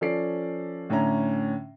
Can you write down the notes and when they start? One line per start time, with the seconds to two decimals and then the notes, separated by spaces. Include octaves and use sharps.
0.01 F3 C#4 A4 D5 C7 D7
0.90 A2 D3 C#4 A#5